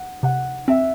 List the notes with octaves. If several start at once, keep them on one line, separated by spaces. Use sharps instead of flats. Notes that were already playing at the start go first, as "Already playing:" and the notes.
Already playing: F#5
C3 F#5
C4 E5